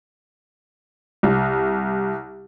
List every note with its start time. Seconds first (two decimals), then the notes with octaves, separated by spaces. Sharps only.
1.23 C2